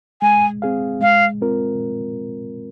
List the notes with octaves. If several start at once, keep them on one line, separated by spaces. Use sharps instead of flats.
G#3 G#5
C4 G#4 F5
G#3 F5
C4 F4 A#4